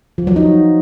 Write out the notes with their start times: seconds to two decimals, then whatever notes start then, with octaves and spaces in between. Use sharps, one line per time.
0.18 F3
0.27 F#3
0.36 D#4